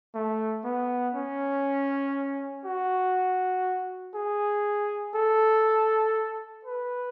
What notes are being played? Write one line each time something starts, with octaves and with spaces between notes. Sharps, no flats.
A3
B3
C#4
F#4
G#4
A4
B4